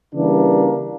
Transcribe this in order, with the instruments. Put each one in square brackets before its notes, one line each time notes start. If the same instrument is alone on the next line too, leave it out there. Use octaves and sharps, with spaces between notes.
[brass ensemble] C#3 E3 G3 A#3 D4